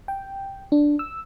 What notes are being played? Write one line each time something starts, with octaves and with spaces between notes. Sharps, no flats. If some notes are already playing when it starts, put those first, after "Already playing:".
G5
D4
E6